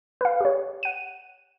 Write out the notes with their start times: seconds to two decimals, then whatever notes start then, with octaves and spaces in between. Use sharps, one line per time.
0.21 B4 F5
0.41 G4 C#5
0.83 F#5 D#7